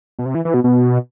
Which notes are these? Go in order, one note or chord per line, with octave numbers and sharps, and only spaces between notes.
B2
C3
E3
E3
B2
B2